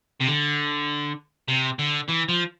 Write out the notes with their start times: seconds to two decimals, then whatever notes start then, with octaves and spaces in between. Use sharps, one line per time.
0.20 C3
0.27 D3
1.48 C3
1.79 D3
2.09 E3
2.29 F3